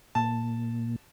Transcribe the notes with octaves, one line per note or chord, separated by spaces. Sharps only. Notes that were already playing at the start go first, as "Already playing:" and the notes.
A#2 A5